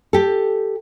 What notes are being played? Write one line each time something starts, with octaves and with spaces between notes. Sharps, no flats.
G4 A4